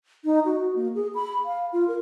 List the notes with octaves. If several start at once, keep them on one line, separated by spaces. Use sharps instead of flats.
D#4
F#4
A#3
G#4
B5
F5
F4
A#4